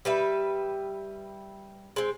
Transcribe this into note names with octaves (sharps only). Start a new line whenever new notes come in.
G3 B4 E5
G#3 C4